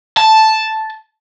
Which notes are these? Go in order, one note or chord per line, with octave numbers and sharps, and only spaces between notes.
A5